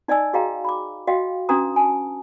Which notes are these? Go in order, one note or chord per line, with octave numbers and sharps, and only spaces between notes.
D#4 D5 D#5 G#5 E6
F#4 G#4 D#5 F5 G5 A#5
B5 D6
F#4 D#5 F5 G5
C#4 D4 F#4 B4 A#5 D#6
G#5 A5